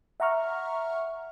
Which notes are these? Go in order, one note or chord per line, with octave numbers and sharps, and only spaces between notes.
E5 F#5 A#5 C#6 F6